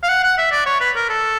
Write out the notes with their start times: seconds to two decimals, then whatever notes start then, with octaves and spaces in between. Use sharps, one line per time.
0.03 F5
0.09 F#5
0.23 F#5
0.38 E5
0.52 D5
0.66 C#5
0.81 B4
0.96 A#4
1.10 A4